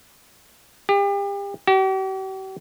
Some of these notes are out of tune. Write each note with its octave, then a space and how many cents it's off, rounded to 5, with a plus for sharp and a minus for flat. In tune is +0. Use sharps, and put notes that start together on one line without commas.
G4 +35
G4 -45